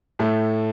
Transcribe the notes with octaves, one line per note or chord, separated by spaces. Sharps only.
A2 A3